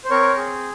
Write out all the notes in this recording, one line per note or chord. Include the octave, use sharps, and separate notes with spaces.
C5
C4 A#4 C#5
G#4